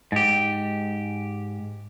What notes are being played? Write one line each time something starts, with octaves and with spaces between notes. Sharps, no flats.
G#2 G4